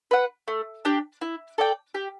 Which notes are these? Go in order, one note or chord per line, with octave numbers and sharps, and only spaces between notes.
B4 F#5
A3
D4 G4
E4
A4 D5 G5
G4